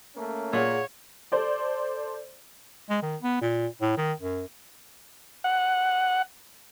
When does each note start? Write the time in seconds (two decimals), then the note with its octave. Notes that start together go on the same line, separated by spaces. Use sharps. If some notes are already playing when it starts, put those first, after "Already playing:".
0.15 A3 A#3 C#4
0.53 A#2 G#4 C#5 F#5
1.32 A4 C5 D5
2.90 G#3
3.02 D#3
3.22 B3
3.41 A#2
3.81 A2
3.97 D#3
4.20 F#2
5.44 F#5